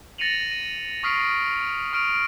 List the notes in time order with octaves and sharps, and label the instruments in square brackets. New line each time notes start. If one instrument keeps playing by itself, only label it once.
[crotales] A6 A#6 C#7 D#7 F7 F#7
D#7
C#6 D#6 F6 B6 C7 D7
C#6 F6 D7 D#7 F7